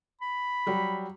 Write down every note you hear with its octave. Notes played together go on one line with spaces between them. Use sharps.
B5
F#3 G3